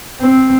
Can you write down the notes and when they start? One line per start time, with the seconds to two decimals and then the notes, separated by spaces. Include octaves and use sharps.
0.21 C4